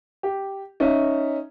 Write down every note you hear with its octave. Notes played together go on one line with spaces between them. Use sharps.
G4
C#4 D#4 E5